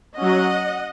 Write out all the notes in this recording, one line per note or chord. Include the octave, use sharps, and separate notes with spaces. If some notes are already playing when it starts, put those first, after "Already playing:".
F#3 C#4 D#5 F#5